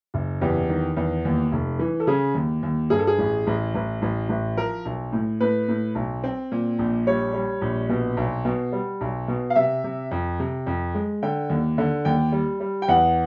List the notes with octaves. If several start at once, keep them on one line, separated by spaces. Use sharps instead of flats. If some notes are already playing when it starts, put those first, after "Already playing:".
F#1
E2 G4
D#3
E2
D#2
F1
E3
A4
C#3 G#4
D#2
D#2
G2 G#4
A4
G#4
A1
A1
A1
A1
A1
F3 A#4
B1
A2
A2 B4
A2
B1
C4
A#2
A#1
G3 C#5
G3
A#1
B2
B1
B2
G3
B1
B2
F5
C3 E5
C3
F2
C3
F2
G#3
D3 G5
D#2
D3
D#2 G5
G3
G3
G5
E2 F#5